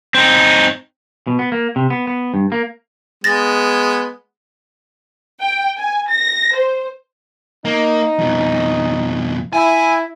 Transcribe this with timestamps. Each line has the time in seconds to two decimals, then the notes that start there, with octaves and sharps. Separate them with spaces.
0.15 C4 D#4
1.27 B2
1.39 B3
1.52 A#3
1.76 C3
1.90 B3
2.07 B3
2.34 G2
2.52 A#3
3.24 G#3 B3 A6 A#6
5.40 G5
5.77 G#5
6.09 A#6
6.55 C5
7.65 A#3 D#4
8.19 F2 B2
9.53 E4 G#5